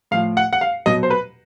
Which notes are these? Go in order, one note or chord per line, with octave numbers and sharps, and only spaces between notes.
A2 F3 F5
F#5
F#5
F5
B2 F#3 D#5
C5
B4